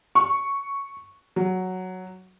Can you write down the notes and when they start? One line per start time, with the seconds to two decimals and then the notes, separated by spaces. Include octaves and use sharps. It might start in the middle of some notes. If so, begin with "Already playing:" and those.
0.15 C#6
1.36 F#3